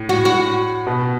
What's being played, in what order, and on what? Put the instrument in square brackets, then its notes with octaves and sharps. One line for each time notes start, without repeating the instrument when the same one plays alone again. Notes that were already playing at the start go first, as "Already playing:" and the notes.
Already playing: [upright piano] A2
[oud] F#4
F#4
[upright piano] B2